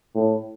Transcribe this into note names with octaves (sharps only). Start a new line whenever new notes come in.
A2